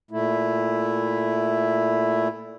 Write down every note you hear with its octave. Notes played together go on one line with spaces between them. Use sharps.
A#2 A3 E4